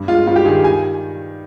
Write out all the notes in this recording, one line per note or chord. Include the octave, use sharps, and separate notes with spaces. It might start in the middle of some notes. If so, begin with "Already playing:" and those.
Already playing: G2
G#3 F4
G2 F4
G4
D#3 G#4
G#5